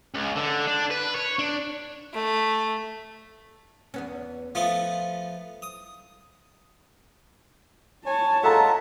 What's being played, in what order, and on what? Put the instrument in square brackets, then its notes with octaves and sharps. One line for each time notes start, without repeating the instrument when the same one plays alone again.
[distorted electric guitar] C#2
D3
D4
B4
C#5
D4
[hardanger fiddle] A3
[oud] E2 B3 C#4
[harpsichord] F3 A3 B3 [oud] F4
[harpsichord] D#6
[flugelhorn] C#5 [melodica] G#5 [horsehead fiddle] A5
[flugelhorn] G#3 [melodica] F4 E5 F#5 [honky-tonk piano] A4 A#5